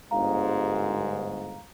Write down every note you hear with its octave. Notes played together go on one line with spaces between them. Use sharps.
G1 G#2 F5 A#5